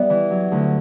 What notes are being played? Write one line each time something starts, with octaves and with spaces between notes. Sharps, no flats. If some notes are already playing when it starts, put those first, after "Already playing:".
Already playing: G3 B3 D5 E5
E3
F#3
D2